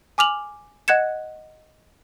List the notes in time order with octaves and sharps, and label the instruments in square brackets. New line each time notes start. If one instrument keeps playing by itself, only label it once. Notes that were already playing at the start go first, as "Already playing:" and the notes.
[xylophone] G#5 D6 F6 F7 F#7
D#5 F#5 F#6 G#6 C#7 E7